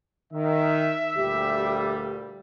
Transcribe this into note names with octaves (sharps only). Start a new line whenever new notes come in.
D#3 E5
D2 A#2 G3 G4